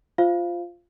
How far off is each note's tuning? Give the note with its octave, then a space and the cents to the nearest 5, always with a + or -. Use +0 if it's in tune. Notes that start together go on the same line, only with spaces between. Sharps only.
F4 +0 C5 +0 F5 -15